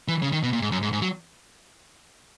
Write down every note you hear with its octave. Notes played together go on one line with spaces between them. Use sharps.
E3
C#3
D#3
B2
A#2
G#2
F#2
G#2
G#2
F#3